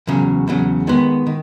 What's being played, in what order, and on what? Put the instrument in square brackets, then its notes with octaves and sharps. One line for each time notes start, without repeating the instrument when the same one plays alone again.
[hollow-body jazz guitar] E2 C#3 F#3
E2 C#3 F#3
D#3 G#3 B3
D#3